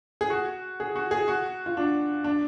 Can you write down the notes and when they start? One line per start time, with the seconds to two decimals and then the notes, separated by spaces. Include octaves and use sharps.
0.21 G#4
0.30 F#4
0.80 G#4
0.96 F#4
1.11 G#4
1.28 F#4
1.66 F4
1.77 D4
2.24 D4